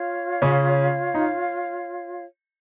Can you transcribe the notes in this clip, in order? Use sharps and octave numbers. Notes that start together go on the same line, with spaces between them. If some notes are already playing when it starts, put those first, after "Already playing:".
Already playing: F4 C#5 F5
C#3 C#4
D#4